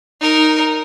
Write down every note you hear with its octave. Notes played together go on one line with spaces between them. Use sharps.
D#4 A#4